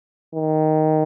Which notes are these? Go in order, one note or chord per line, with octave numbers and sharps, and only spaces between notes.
D#3